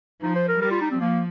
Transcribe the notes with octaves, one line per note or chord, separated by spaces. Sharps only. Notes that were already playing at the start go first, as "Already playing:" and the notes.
F3 D#4
C5
A#4
G3 A#4
F4
D#4
C4
F3 A#3